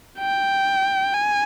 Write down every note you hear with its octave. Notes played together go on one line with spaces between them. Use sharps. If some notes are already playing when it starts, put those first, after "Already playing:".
G5
G#5